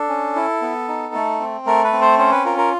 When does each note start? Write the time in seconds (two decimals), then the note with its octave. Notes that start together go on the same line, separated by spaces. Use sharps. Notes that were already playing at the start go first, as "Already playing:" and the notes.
Already playing: D4 A4
0.09 C#4
0.36 E4
0.62 B3
0.89 D#4
1.14 A3
1.40 C4
1.66 A3 A#4
1.84 B4
1.93 C4
2.02 C5
2.19 C#4 C5
2.32 B4
2.45 F4 A#4
2.58 A#4